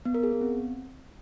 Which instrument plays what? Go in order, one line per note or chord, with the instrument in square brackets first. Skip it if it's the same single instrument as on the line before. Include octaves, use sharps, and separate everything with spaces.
[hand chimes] B3
A#4
G#4
B3
C4